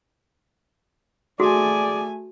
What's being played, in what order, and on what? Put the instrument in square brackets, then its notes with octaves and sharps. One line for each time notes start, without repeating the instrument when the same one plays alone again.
[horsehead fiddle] A3 G#5 [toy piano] F#4 [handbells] G#4 [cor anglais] D5